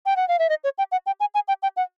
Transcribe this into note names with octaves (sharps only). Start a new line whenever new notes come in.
G5
F#5
F5
E5
D#5
C#5
G5
F#5
G5
G#5
G#5
G5
G5
F#5